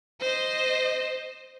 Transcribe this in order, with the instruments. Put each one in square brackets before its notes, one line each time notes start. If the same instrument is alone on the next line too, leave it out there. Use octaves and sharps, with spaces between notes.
[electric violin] C5 D#5